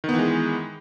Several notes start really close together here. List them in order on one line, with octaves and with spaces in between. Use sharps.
D#3 B3 E3 G#3